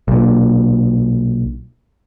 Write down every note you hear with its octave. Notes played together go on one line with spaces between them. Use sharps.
B1 A#2